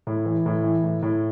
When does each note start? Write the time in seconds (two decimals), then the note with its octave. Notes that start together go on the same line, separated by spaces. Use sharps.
0.07 A2
0.25 E3
0.46 A2
0.64 E3
0.84 A2
1.02 A2